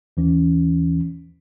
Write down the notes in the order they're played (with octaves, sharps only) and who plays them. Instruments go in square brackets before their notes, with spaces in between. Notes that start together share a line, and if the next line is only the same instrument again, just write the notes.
[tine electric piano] D#2 E3 C#4